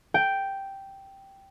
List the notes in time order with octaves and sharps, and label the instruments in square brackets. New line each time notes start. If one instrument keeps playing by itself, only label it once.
[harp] G5